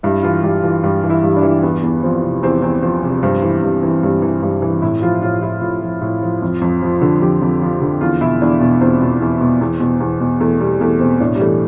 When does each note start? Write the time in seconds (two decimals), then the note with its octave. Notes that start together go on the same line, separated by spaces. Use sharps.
0.03 G2 E4
0.23 E3 F4
0.43 G2 G4
0.63 E3 F4
0.83 G2 G4
1.04 E3
1.10 E4
1.23 G2
1.37 D4
1.43 E3
1.63 E2 B3
1.83 E2
2.03 F3 C4
2.23 C3
2.42 E2 C4
2.62 E2 C4
2.82 F3 C4
3.03 C3
3.23 G2 C4
3.42 E3
3.62 G2
3.83 E3
4.03 G2
4.22 E3
4.42 G2
4.62 E3
4.82 A2 E4
5.02 F3 F4
5.22 A2 F4
5.42 F3 E4
5.61 A2 F4
5.82 F3
6.01 A2
6.22 F3
6.42 F2
6.61 F2
6.82 F3
7.01 D3
7.22 F2 G4
7.41 F2
7.62 F3
7.81 D3
8.01 E2 F4
8.21 B2 E4
8.42 E2 D4
8.61 B2
8.81 E2 C4
9.01 B2
9.21 E2
9.41 B2
9.61 E2
9.80 B2
10.00 E2
10.21 B2
10.40 E2 A3
10.60 B2 G3
10.80 E2 A3
11.00 B2 C4
11.20 A2 D4
11.35 G3
11.40 E3 A3